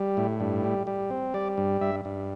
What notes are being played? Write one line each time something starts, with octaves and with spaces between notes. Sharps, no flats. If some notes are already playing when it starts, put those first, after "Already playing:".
Already playing: G3
A2
G2
G3
G3
C4
G3 D5
G2
G2 E5
G2